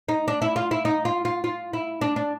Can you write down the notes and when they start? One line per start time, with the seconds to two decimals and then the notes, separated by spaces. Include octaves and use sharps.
0.08 D#4
0.28 D4
0.42 E4
0.56 F4
0.71 E4
0.85 D#4
1.05 F4
1.25 F4
1.44 F4
1.73 E4
2.01 D4
2.16 D4